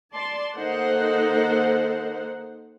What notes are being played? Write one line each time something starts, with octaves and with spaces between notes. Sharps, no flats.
D5 A5 C6
D#3 A#3 D#4 A4 C5 F#5